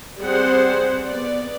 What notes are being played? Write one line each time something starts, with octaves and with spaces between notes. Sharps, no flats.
G3 C4 G#4 C5 F#5
B3 D5